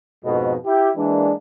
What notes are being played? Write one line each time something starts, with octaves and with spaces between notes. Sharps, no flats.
F2 G#2 B2
E4 G4
E3 G#3 A#3 D4